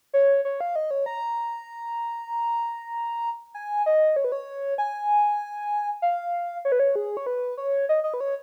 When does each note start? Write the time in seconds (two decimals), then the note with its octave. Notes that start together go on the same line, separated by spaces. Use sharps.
0.14 C#5
0.45 C#5
0.61 F5
0.76 D#5
0.91 C#5
1.06 A#5
3.54 G#5
3.86 D#5
4.16 C#5
4.24 B4
4.32 C#5
4.78 G#5
6.02 F5
6.65 C#5
6.72 B4
6.80 C#5
6.96 G#4
7.17 C#5
7.26 B4
7.57 C#5
7.89 D#5
8.04 D#5
8.14 B4
8.20 C#5